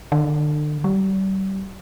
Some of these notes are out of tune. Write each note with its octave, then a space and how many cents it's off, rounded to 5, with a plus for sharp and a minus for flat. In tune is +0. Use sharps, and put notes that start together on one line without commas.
D3 +35
G3 -35